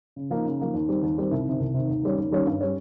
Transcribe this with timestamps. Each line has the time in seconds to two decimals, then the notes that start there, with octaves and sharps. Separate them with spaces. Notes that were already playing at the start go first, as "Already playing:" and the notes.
0.16 C#3
0.30 F3 A#3 D#4
0.45 C#3
0.59 F3 A#3 D#4
0.74 D#2
0.88 D#3 G3 C4
1.03 D#2
1.17 D#3 G3 C4
1.31 C2
1.45 C3 D#3
1.60 C2
1.74 C3 D#3
1.89 D#2
2.03 D#3 G3 C#4
2.18 D#2
2.31 D#3 G3 C#4
2.47 G2
2.61 G3 C#4